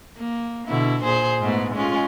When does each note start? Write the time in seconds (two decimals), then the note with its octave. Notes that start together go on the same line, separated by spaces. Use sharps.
0.17 A#3
0.68 B2 D3 E4
1.03 A#2 G#4 C5
1.41 G#2 A3 B3
1.75 G#3 C#4 F4